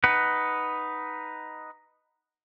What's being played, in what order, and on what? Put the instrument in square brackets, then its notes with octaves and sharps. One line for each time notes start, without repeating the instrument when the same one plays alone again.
[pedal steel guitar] D#4 B4 F#5